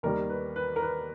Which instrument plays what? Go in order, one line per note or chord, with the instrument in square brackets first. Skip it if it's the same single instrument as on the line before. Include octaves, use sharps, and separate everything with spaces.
[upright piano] D#2 D#3 G3 A#4
B4
B4
A#4
B4